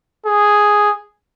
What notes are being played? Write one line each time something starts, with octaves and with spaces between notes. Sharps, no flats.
G#4